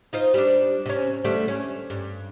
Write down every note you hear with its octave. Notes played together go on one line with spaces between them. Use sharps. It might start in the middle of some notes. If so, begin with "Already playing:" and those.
D#4 F4 C5
G3 D4
C3 C#4
D3 G3 A3
C#4
G2